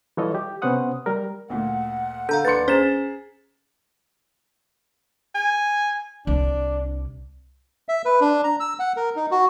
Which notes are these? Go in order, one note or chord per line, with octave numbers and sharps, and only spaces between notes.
E3 G3 F4 A4 C#5 D#5
G4
C3 B3 C#4 C5 F#5 D#6
G3 A#4
D2 A#2 F#5
D3 A4 F5 A#5 G6
D#2 D4 B4 C6 A6 C#7
C#4 G#4 C5 A#5 A6 E7
G#5
C2 D4
E5
B4
D4
A#5
E6
F#5
A#4
D#4
F#4